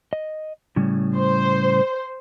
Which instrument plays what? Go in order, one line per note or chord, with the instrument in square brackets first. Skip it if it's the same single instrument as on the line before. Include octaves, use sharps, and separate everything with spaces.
[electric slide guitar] D#5
A2 C#3 G3
[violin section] C5